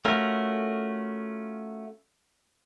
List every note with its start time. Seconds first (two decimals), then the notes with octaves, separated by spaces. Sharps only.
0.05 A3 C#4 F4 F#4 A#4